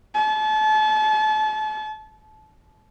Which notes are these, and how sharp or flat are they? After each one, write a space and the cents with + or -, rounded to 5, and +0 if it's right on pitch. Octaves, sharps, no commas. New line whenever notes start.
A5 -35